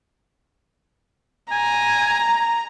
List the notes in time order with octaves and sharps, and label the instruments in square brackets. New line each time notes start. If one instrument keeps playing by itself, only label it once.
[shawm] G#5 [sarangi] A#5